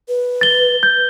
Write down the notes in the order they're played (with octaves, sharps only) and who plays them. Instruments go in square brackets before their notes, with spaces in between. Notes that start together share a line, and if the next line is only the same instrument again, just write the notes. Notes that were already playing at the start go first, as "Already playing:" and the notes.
[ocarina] B4
[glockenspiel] A6 G7
G6